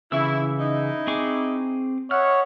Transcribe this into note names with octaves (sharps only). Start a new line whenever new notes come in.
C#3 E3 E4 C#6 E6
D#4 E4
C4 G#4 C#6 D6
C#5 D#5 E5 F#5 F6